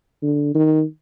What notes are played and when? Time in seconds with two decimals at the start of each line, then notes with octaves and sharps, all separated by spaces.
0.23 D3
0.55 D#3